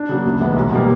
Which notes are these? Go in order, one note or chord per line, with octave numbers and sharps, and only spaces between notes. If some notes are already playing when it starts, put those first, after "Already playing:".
Already playing: D4
C#3 F#3 A#3
D2
C3 E3 G#3 B3
B1
B2 G3 A#3